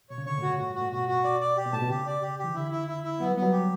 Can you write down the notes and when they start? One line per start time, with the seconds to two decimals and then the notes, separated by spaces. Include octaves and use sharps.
0.10 B2 C#5
0.18 C#3
0.26 D3 C#5
0.38 A2 F#4
0.48 G2
0.59 A2 F#4
0.70 G2
0.75 F#4
0.82 A2
0.92 B2 F#4
1.08 F#4
1.24 D5
1.40 D5
1.57 G4
1.66 B2
1.73 A2 A5
1.82 B2
1.90 C#3 G4
2.07 D5
2.22 G4
2.39 G4
2.44 E3
2.55 D3 E4
2.71 E4
2.88 E4
3.03 E4
3.20 F#3 B3
3.31 G3
3.36 B3
3.43 F#3
3.52 G4